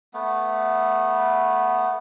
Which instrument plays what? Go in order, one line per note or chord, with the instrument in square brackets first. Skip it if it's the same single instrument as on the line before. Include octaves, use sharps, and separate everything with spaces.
[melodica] A3 B3